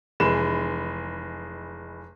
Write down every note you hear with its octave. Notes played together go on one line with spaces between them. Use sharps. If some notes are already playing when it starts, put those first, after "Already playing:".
F1 E3 G#3 B4 E7